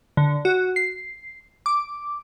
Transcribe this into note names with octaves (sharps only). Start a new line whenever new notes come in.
D3
F#4
C7
D6